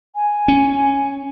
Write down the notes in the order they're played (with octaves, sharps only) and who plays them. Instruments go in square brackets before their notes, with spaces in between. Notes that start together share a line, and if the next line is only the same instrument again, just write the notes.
[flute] G#5
[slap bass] C#4